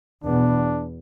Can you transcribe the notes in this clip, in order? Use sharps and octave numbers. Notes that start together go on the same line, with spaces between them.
E2 B2 B3 D4